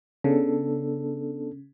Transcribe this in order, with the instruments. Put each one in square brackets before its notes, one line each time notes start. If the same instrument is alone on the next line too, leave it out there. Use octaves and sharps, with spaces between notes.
[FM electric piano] C#3 [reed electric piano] B3 D4 A4